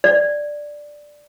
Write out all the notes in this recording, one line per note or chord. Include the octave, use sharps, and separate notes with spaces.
D5